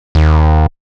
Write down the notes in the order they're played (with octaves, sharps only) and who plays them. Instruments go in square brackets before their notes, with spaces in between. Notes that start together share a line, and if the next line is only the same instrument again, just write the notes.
[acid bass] D#2